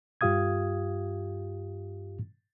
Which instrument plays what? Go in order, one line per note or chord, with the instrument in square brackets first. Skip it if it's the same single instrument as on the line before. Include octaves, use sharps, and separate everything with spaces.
[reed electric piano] G2 F4 G4 F5 D#6 G#6